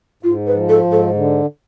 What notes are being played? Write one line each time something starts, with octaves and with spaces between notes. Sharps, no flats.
G#2 F4
B4
F3
A4
G#2
A4
D3